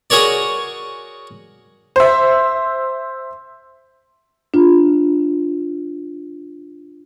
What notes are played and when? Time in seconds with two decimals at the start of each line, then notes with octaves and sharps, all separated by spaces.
0.10 F#4 G#4 A#4 C#5 D5
1.96 C5 E5
4.54 D4 F4